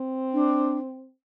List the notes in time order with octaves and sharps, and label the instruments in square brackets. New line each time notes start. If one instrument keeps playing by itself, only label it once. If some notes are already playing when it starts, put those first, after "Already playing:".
Already playing: [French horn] C4
[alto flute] D4